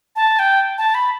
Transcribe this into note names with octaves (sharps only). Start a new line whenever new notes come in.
A5
G5
A5
B5